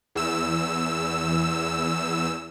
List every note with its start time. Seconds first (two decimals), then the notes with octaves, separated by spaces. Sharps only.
0.15 E2 E6